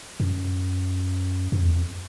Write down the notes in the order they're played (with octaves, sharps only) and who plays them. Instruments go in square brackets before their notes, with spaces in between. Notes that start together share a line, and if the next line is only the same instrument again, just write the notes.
[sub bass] F#2
F#2
F2
E2
F2